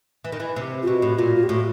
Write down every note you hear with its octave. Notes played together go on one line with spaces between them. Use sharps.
E3
D#3
E3
C3
F4
B2 F#4
A2
A#2 F4
F4
G4
A2 F#4